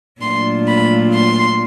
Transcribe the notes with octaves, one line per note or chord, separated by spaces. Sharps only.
A#2 F#3 A3 D4 F4 C6
B5
C6